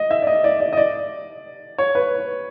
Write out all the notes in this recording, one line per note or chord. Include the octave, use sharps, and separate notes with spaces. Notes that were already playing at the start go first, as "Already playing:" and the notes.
Already playing: D#5
E5
D5
D#5
D5
D5
D#5
D5
C#5
B4